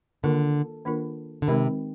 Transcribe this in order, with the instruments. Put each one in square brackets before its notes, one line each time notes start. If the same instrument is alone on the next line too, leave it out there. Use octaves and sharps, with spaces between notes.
[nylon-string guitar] D3 [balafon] D#3 A#3 D4 F4 A#4
[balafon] D#3 A#3 D4 F4 A#4
[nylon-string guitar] D3
[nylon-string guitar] C3 [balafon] D#3 G#3 C4 D#4 A#4